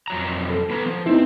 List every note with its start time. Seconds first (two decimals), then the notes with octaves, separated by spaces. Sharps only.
0.08 F2 F#3 A#5
0.50 A4
0.70 B3 B4 A#5
0.86 F3
1.06 B3 C4 D#4 E4